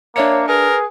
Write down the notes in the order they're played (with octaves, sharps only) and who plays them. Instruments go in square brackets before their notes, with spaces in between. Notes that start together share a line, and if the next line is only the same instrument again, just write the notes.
[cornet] A#3 [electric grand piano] D4 E5 C#7 [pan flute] C#5
[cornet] G#4 [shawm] A#4 [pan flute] B4